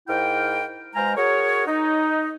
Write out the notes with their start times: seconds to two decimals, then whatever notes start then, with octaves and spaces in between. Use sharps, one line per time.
0.08 G#2 E4 A#4 F5 G5
0.95 B2 G#3 C5 F5 G#5 A#5
1.16 F#4 G#4 A#4 C#5
1.67 D#4